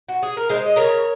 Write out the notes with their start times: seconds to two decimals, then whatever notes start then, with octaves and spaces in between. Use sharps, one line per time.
0.09 F#4
0.23 G#4
0.37 A#4
0.49 G#3 G#4 C5
0.66 D#5
0.76 C#3 A#4 C#5